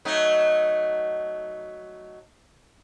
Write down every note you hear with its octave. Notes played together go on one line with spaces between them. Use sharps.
F#3 A3 D#4